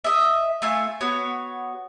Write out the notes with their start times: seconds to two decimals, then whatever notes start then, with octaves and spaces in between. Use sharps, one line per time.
0.04 D#5 E5
0.62 A3 F4 E5 G#5
1.01 B3 F#4 C#5